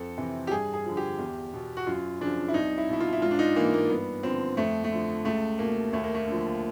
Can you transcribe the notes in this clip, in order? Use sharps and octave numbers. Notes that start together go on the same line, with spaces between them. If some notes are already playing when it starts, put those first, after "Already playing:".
Already playing: F2 A4
C3 E3
G4
G2 G#4
G#4
D3 F3
G4
E2
B2
F#4
F#2 F4
C#3 F3 D4
E4
C2 D#4
E4
B2 E4
F4
E4
G#2 F4
D4
D#4
E3 A#3
A#3
G2 B3
D3 F3 C4
F2 A3
A3
D3 F3
C#2 A3
B2 A#3
D#2 A3
A#3
A3
D3 F3